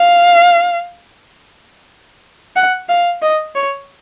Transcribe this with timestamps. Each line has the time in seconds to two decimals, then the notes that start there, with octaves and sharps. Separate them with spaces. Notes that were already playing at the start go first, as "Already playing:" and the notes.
Already playing: F5
2.56 F#5
2.89 F5
3.22 D#5
3.55 C#5